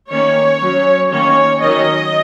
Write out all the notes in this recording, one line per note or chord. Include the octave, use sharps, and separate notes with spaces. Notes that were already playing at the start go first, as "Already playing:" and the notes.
D#3 A#3 C#4 C#5
F#3 C#4
D#3 A#3 C#4 C#5
D#3 F#3 C#4 D#5